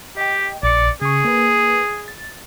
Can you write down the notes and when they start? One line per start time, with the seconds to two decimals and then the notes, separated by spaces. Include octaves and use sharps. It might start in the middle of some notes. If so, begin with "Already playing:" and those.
0.17 G4 D#5 G5
0.63 A#1 D5 C#7
1.01 C#3 G#4 C#6
1.25 A#3 B4
2.08 A6